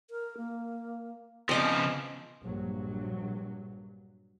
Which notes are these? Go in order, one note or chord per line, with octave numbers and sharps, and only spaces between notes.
A#4
A#3
C#3 F3 B3 C4 D#5 D6
A#1 G2 F#3